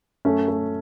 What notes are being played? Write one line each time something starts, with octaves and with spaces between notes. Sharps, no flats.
F#2 A3 C#4
A3